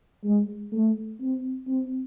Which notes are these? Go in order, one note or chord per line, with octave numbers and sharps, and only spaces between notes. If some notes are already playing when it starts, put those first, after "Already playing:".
G#3
A3
C4
C4